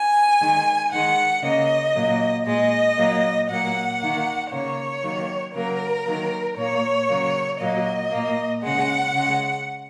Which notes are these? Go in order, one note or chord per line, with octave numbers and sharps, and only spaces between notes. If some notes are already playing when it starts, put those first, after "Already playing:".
Already playing: G#5
D#3 G#3
D#3 G#3 F#5
C#3 A#3 D#5
A#2 F#3 A#3
A#2 G#3 D#5
A#2 F#3 A#3
A#2 F#3 A#3 F#5
D#3 A#3
C#3 A#3 C#5
D#3 F#3 A#3
C#3 F#3 A#3 A#4
D#3 F#3 A#3
A#2 A#3 C#5
C#3 F#3 A#3
A#2 F#3 A#3 D#5
A#2 A#3
C#3 G#3 F#5
C#3
G#3